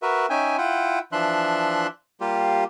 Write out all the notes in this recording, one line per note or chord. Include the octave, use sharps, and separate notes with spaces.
F#4 A#4 B4 E5
C#4 D#4 E5 G5 G#5
E4 F4 F#5 G5
E3 F3 D4 E5 C6 F#6
G3 A#3 F4 G4